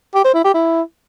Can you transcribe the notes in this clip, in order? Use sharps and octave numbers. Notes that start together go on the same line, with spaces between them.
G4
C5
E4
G4
E4